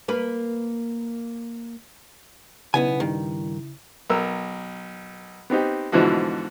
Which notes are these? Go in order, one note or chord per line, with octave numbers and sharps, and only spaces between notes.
A#3 B4
B1 C#3 B3 E4 G#5
G2 D#3
B1 A#4 E6
B3 C4 D#4 G4
G#2 B2 D3 E3 F3 F#4